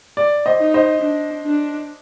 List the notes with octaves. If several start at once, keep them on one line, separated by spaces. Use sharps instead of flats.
D5
C5 D#5
D#4
C5 D#5
D4
D4